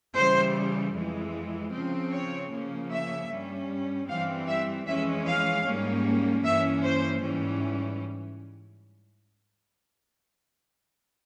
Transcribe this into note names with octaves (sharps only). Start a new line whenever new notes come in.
C#3 E3 G3 C5
F2 E3 G#3
C#3 F3 C4
C#5
C#3 F3 A#3 C#4
E5
G2 G3 C#4
G2 E3 G3 C4 F5
E5
F2 E3 G#3 C#4 E5
F5
G#2 G3 A#3 C#4
G2 E3 A#3 C#4 E5
C5
G#2 E3 G3 C#4